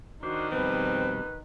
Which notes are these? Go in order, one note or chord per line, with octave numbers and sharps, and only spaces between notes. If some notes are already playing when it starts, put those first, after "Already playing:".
D#3 D4 F#4 C5
F2 B2 G3 C4 B4